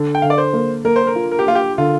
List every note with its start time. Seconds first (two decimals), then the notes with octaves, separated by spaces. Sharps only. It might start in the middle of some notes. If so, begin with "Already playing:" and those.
Already playing: D3
0.15 G5
0.22 D3 F5
0.30 D5
0.38 C5
0.53 A#3
0.85 A#3 A#4
0.96 C5
1.07 A#4
1.15 F4
1.32 A#4
1.39 G4
1.47 A#3 F4
1.55 G4
1.78 D3 F4